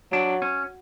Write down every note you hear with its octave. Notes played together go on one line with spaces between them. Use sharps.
F#3 D4
C#4